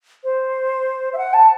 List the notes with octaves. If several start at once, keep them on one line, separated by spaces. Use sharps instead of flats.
C5
E5
F#5
A5